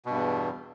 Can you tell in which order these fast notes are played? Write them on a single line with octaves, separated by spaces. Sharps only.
B2 G2 E2